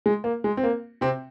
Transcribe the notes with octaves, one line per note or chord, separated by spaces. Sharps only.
G#3
A#3
G#3
C4
A#3
C3 C4